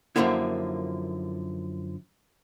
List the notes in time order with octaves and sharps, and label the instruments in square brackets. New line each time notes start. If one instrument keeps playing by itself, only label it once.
[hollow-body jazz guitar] F#2 A#2 D3 F3 A#3 E4